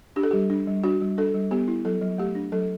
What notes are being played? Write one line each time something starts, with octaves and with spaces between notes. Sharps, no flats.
D4 G4
A4
G3 G4
D4
G3
D4 F#4
G3
D4 A4
G3
B3 G4
E4
F#3 A4
F#3
A3 G4
D4
F#3 A4